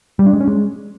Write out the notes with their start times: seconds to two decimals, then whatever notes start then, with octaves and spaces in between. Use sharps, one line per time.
0.19 G3
0.26 D4
0.33 G#3
0.40 C#4
0.48 G#3